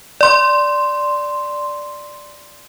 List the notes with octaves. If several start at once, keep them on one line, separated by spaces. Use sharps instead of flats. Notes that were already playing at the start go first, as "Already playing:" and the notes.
D5 C6